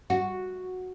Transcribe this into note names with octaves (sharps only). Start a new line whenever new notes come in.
F#4